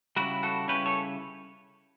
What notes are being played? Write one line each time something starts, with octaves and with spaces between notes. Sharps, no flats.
C#3 G3 C#4 E4 F#4
F#4 A4
C#3 G3 C#4 E4 G4 B4
A4 C#5